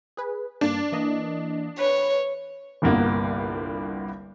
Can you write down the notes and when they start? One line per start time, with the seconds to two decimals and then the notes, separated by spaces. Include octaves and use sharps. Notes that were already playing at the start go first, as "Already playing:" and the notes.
0.17 G#4 B4
0.61 G2 A#3 D4 A6
0.92 E3 A#3 D#5
1.79 B4 C#5
2.82 G1 C2 G2 A#3 B3